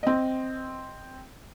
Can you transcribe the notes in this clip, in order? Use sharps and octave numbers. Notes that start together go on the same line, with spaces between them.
C4 D#5